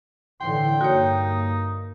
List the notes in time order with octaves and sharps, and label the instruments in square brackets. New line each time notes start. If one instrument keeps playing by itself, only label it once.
[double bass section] A2 D3 E3 [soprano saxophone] G5 [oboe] C6
[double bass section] G2 A#3 [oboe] D#4 [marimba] F#4 C#5